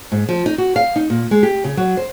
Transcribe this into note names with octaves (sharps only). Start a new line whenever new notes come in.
G#2
F3
D#4
F#4
F5
D#4
A#2
G#3
G4
C#3
F#3
C5